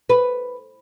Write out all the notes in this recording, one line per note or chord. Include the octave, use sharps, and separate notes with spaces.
B4